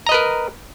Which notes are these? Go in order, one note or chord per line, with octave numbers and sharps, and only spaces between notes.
A#4 B4 D#5 A#5